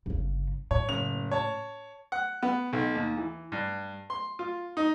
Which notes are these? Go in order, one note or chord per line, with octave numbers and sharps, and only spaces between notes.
G1 C#3
A2 C#5
F#1 F7
C#5 A5
F#5
B3
B1
D#2
E3
G2
C6
F4
D#4